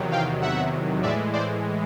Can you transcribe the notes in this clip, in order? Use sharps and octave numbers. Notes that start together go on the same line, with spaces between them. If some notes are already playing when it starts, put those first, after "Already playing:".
Already playing: E2 C3 D#3 F#3
F5 G5
E5 F#5
A2 E3 G#3 D5 E5
C5 D5